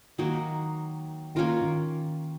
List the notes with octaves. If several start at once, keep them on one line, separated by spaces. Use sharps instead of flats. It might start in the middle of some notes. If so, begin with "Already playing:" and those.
D#3 F#3 A#3 D#4 F#4
D#3 A#3 C#4 F4 A#4
D#3